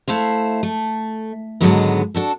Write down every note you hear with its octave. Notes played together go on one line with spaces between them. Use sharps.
A3 E4 C5 F5
A3
G#2 D3 D#3 F#3 G#3 B3
D4 F#4 A4